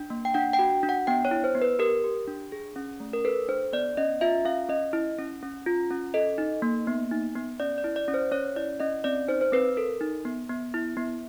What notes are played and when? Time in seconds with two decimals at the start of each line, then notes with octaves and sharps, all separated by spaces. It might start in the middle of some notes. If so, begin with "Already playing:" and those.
Already playing: D4
0.10 A#3
0.25 G5
0.34 D4 F#5
0.53 G5
0.59 F#4
0.83 D4
0.89 F#5
1.07 B3 G5
1.25 C#5
1.31 E4
1.44 C5
1.55 B3
1.62 B4
1.79 G4 A#4
2.04 G4
2.27 D4
2.52 G#4
2.76 C#4
3.00 A3
3.13 A#4
3.25 A4 B4
3.48 D4 C5
3.73 B3 D5
3.97 C#4 D#5
4.21 F4 E5
4.45 C#4 F5
4.69 C#4 D#5
4.93 E4
5.18 C#4
5.43 C#4
5.66 F4
5.90 C#4
6.14 A4 D#5
6.38 D#4
6.62 A#3
6.87 B3
7.11 D#4
7.35 B3
7.60 C#4 D5
7.78 D5
7.84 E4
7.96 D5
8.08 C#4
8.14 C5
8.31 C#4 C#5
8.56 E4 D5
8.80 C#4 D#5
9.04 C4 D5
9.28 D#4 C5
9.41 C5
9.52 C4 B4
9.77 A4 A#4
10.01 D#4
10.25 B3
10.49 B3
10.74 E4
10.97 B3